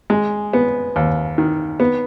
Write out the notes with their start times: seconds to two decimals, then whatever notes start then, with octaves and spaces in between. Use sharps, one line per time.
0.10 G#3
0.53 B3
0.96 D#2
1.38 D#3
1.80 B3